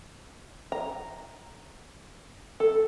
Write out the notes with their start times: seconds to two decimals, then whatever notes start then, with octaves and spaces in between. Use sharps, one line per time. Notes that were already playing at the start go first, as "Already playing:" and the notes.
0.72 A#5
2.60 A4